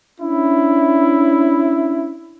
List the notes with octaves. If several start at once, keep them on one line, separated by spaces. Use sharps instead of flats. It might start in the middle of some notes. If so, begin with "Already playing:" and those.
C#4 D4 E4